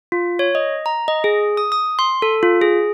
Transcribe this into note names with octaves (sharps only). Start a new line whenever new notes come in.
F4
C#5
D#5
A#5
D#5
G#4
D#6
D#6
C6
A4
F4
G#4